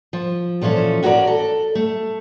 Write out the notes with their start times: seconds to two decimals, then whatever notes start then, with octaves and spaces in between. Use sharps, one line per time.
0.13 F3
0.61 A#2 E3 F3 C#4 A4
1.03 C#4 F#4 A#4 B4 D5
1.27 A4
1.75 A3